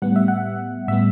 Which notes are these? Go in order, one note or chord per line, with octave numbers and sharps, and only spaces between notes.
A2 G3 B3 F#5
E5
F#5
A2 G3 B3 E5